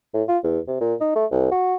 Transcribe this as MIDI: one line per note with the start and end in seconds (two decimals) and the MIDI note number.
0.14 0.23 45
0.28 0.38 65
0.43 0.59 40
0.67 0.79 48
0.80 0.94 46
1.01 1.12 63
1.15 1.25 57
1.31 1.48 36
1.51 1.76 66